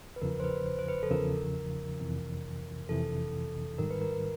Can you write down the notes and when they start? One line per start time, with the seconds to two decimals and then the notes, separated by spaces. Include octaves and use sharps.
0.16 B4
0.22 E2 C#3 F3 A#4
0.40 C5
0.44 B4
0.66 C5
0.79 C5
0.88 B4
1.03 A4
1.11 E2 C#3 F3 A#4
2.00 F2 C3 E3
2.89 F2 C3 E3 A4
3.78 G#2 D#3 G3 A#4
3.91 B4
4.02 A#4